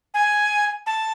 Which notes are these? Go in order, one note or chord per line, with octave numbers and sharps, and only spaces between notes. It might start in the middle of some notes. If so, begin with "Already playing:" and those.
G#5
A5